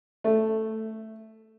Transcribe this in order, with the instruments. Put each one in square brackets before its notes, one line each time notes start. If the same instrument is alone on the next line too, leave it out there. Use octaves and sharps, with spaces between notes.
[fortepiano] A3